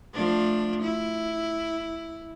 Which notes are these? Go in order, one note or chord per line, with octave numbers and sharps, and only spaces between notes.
F3 A3 D4
E4